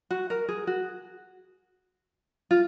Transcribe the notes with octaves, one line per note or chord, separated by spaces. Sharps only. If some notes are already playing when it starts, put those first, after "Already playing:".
F#4
A#4
G#4
F#4
F4